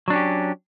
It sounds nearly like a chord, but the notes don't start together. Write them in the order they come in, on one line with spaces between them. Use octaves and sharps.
F#3 D4 C#4 G4